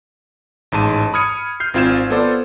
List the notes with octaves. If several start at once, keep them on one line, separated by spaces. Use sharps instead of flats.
A1 G#2 A5 D#7
B5 D#6 F6 G#6 C#7 D#7
F6 G6 C7
G#1 C4 F4 G#6 E7
B3 F4 A4 C5 D5